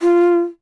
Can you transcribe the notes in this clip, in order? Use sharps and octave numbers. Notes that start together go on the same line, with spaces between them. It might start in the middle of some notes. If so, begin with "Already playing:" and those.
F4